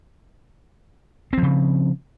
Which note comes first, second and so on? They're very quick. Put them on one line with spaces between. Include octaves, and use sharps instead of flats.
C4 F3 C#3